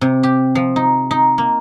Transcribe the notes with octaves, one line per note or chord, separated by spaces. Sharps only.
C3
G4
F3
D#4
D#4
A#3